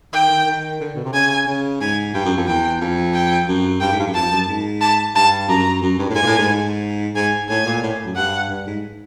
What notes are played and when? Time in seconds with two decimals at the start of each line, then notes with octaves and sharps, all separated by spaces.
0.13 D#3 G5
0.30 D#3
0.47 D#3
0.80 D3
0.95 B2
1.05 C3
1.13 C#3 G#5
1.47 C#3
1.81 G#2 G#5
2.14 G2 G5
2.25 F#2
2.36 F2
2.48 E2 G5
2.81 F2
3.14 G5
3.48 F#2
3.81 G2 G5
3.92 G#2
3.99 G2
4.07 F#2
4.14 F2 A5
4.32 F#2
4.48 G#2
4.81 A5
5.15 G2 A5
5.49 F#2 A#5
5.82 F#2
5.99 G2
6.10 A2
6.15 G#2 G#5
6.23 A#2
6.27 A2
6.38 G#2
7.15 G#2 G#5
7.49 A2 G#5
7.66 A#2
7.83 A2
8.05 F#2
8.16 G2 F#5
8.49 G2
8.67 G#2